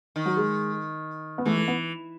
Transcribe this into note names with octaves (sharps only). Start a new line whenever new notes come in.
D#3
F#3
G#3
B3
E3 A3
A3
B3